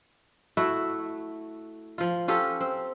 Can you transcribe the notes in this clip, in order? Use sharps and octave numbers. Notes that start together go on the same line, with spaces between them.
A3 E4 F#4
F3 F4
C#4 F4 G4 A4
C4